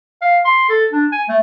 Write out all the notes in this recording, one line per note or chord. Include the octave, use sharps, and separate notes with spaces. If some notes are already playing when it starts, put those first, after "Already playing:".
F5
C6
A4
D4
G#5
A3